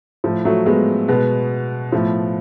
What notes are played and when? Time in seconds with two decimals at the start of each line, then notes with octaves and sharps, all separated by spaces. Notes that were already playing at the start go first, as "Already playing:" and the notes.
0.24 A2 F3
0.45 F#3 A3
0.66 G#3 B3
1.08 B2 G#3 B3
1.92 A2 F3